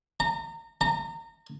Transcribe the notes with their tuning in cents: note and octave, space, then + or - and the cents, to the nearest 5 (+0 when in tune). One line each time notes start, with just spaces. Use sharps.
A#5 -30
A#5 -30